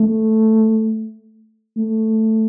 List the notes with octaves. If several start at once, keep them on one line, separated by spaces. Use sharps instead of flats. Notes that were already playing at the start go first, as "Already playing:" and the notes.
Already playing: A3
A3